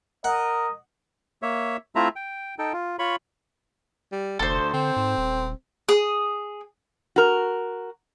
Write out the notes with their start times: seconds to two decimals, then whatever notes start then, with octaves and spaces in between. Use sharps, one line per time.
0.24 A#4 D#5 F#5
1.42 A#3 C#5 E5
1.95 A3 C4 E4 F4 E5 A#5
2.16 G5
2.59 D#4 A4 G5
2.73 F4
2.99 F4 C#5 B5 C#6
4.12 G3
4.39 F1 D2 A4 C5
4.73 D3 C4
4.96 G#2
5.17 D#1
5.88 G#4 D#6
7.16 F#4 A#4